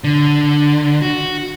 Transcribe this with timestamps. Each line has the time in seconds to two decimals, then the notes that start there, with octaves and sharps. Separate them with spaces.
0.04 D3
1.02 F#4